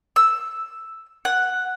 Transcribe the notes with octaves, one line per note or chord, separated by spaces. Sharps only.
E6
F#5